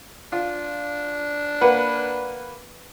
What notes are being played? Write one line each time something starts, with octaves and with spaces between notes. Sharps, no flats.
D4 F4
A#3 B4 F#5